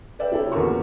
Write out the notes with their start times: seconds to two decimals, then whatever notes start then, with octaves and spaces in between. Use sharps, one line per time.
0.19 B4 D5 E5 G5
0.31 C3 E4 A4 C#5
0.52 E2 A#2 C#3 F#4 A#4 C#6